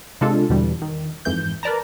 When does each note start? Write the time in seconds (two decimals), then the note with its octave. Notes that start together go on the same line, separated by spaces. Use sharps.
0.21 C3 G#3 D4 F4 A4
0.50 E2 B2 D3 E3 G3
0.82 D#3
1.25 F2 G#2 E3 G6
1.63 A#4 B4 D5 A5 A#5